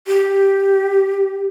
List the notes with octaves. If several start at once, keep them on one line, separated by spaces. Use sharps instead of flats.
G4